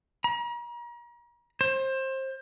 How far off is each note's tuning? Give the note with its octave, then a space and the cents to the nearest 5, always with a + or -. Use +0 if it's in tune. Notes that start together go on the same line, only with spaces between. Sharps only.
A#5 +40
C5 +25